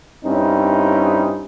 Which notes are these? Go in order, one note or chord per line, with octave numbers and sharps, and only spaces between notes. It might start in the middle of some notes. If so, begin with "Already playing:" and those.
G2 C4 C#4 D#4 E4